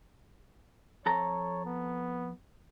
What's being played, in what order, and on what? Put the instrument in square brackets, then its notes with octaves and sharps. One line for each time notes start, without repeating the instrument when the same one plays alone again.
[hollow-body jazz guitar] F2 A4 A#5 [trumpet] C#5
[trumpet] B3